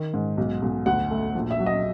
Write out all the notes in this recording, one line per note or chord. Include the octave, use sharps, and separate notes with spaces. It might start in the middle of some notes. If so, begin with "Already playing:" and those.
Already playing: D#3
G#2
B1
B1
D2 F#5
A3
A#1
E5
F#3
D#5